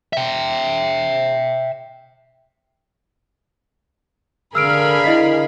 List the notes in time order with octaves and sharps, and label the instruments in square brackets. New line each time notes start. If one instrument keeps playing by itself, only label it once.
[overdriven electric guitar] E5 G5
[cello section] D3 [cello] G#4 F5 [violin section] A#4 B5 [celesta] E6 F6 D7
[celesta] E4 D#5 B6